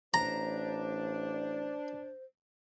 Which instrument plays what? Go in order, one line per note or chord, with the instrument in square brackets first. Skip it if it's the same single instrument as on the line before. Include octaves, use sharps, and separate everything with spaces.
[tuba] A1 [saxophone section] D4 [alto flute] C5 [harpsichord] A#5